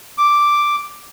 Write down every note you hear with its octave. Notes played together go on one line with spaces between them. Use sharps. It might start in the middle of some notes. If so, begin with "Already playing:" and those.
D6